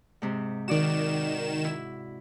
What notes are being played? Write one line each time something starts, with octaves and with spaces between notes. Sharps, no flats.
G#2 C3
D#3 F#4 D5 E7
E4